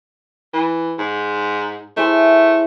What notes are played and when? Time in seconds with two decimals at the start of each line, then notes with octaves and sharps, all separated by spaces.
0.53 E3
0.98 G#2
1.97 A3 E4 G#4 C5